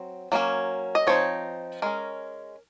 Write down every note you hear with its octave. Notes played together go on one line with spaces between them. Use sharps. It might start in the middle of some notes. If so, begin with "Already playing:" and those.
Already playing: F#3 C4
F#3 A#3 C#4
D#5
F3 C4 D#4 C#5
G#3 C#4 A#4